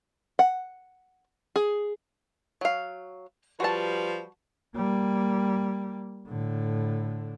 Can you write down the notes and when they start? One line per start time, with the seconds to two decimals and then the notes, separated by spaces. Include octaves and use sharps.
0.39 F#5
1.56 G#4
2.61 F#3 F5
3.60 F3 G3 F#4 B4 A5
4.76 G3 A#3
6.28 A2 D3